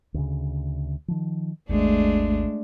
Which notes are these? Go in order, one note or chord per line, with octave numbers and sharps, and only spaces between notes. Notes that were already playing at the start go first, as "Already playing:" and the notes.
D2 C#3
D#3 F3
G#1 D#2 G#3 A3 D4